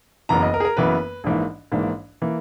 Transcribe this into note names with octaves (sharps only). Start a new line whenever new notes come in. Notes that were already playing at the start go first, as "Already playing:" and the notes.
F#1 F#2 E3 B3 A#5
D#5
A#4
G#4
A#4
F#1 F#2 E3 B3 B4
A#1 G#2 E3 A#3
A#1 G#2 E3 A#3
E3 A#3